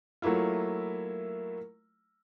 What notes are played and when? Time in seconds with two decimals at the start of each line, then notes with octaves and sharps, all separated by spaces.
0.22 F#3 A3 A#3 E4 F4